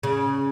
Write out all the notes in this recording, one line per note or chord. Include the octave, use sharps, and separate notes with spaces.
C#3